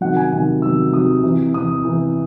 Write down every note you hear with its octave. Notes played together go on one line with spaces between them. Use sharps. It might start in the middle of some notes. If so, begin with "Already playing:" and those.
C3 D#3 F#3 F#5
G#5
C3 D#3 F#3 G#5
C3 D#3 F#3 E6
C3 D#3 F#3 D#6
C3 E3
C3 E3 D#6
C3 E3